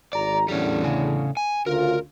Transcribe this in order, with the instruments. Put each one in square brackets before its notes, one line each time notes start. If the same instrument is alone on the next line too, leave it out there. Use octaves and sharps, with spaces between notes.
[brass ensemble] G#1 A#5 [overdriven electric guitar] D5
[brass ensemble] E2 A2 D3 [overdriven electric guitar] G3 C#4
[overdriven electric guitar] C#3
G#5
[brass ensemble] D2 C#3 F4 [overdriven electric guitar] A#4